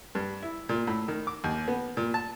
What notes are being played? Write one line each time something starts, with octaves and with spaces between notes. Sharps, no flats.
G2
E4
A#2
A2
D#3
D6
D#2
B3
A#2
A5